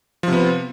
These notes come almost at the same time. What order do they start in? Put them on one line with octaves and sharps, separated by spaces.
F3 C3 B3